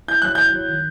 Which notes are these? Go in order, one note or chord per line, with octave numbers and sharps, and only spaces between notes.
E4 G6
F#3 F#6
E4 G6
F#3
D#3